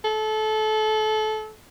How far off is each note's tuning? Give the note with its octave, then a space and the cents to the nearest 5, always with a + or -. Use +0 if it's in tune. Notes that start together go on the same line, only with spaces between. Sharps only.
A4 -25